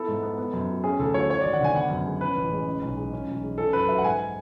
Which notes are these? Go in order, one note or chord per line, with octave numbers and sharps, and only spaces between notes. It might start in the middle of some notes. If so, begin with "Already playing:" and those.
Already playing: B3 E4 A4
G#2
B3
B3
F#2
F#3
C#4 G#4
D2 A4
F#3 C#5
F#3 C#5
G#1 D5
F#5
D3 G#5
B3 F#5
F#2
G#3
C#4 B4
A1
G#3
C#4
B1
G#3
C#4
B1
G#3
C#4 A4
F#2 B4
F#3 E5
F#5
G#2 G#5